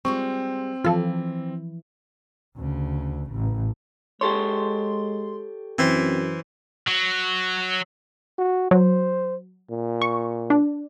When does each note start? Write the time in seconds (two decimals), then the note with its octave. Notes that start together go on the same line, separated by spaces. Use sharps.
0.05 G3 G#3 C4 F4 C#6
0.85 E3 F3 F4 A4
2.56 D2 C#3
3.31 A1
4.21 G#3 G4 A4 C#5 C6
5.78 F#2 E3 C4 E4 C5
6.88 F#3
8.38 F#4
8.71 F#3 C5
9.70 A#2
10.02 C#6
10.50 D4